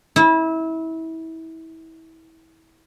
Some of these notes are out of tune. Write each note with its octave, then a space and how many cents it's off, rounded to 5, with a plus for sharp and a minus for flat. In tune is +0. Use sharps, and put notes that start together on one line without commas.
E4 -25